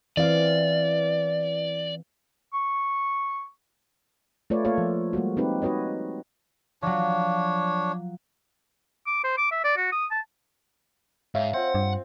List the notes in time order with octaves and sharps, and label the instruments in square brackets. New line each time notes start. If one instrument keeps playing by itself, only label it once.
[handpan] E3 C4 F5 [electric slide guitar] D5
[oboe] C#6
[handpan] A3 F4 B4 C#5 D5
A3 A#3 F4 A4 C#5 F5
F3
G3 G#3 A#3 F#4
C4 D#4 G4 B4
D#4 F#4 B4 C#5 D#5
[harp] F3 F#3 [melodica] D4 C#5
[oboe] D6
C5
D6
E5
D5
F#4
D#6
A5
[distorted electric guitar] G#2 [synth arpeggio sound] C#5 E5 F5
[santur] C4 F4 [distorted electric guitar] F#5
[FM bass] G2